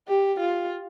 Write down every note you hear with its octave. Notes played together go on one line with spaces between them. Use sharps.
G4
F4